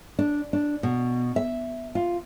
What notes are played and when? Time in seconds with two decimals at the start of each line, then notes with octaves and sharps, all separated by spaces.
0.19 D4
0.53 D4
0.83 B2
1.36 E5
1.95 F4